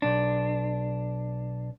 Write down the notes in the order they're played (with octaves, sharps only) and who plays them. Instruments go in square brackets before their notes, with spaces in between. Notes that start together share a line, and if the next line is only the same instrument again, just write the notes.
[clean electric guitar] B1 D4